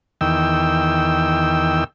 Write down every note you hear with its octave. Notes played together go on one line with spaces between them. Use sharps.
E2 D#3 G5 E6